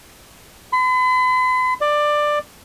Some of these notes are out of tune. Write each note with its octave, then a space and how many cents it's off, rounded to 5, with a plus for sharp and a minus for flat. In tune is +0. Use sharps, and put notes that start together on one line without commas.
B5 +45
D5 +15